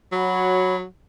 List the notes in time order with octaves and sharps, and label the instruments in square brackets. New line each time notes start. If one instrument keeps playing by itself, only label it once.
[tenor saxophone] F#3 [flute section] F#4 C#5 F#5 B5